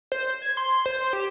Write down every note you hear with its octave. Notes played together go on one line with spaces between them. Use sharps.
C5
G#6
C6
C5
G4